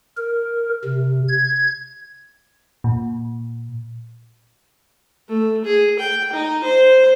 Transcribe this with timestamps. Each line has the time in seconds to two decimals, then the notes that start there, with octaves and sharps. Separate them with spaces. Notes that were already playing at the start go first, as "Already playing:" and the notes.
0.17 A#4
0.85 C3
1.28 G#6
2.84 A#2
5.29 A3
5.65 G#4
5.99 G5
6.33 D#4
6.64 C5